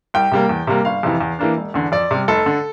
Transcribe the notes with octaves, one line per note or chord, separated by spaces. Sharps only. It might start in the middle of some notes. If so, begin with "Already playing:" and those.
C2 G5
C3 G3 A#3
E2
C3 G3 A#3
G1 F5
F2 C3 E3
E2
E3 A#3 D4
E1
E2 D3
F2 D5
C3 G3
F1 A4
D3